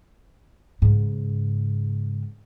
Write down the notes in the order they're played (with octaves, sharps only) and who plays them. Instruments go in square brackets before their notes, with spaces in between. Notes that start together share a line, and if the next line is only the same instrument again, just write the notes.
[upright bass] G#2 C#3